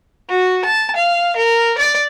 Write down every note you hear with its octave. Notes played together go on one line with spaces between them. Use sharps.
F#4
A5
F5
A#4
D5